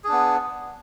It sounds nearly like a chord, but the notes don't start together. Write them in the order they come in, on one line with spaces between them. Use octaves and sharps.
G#4 D4 B3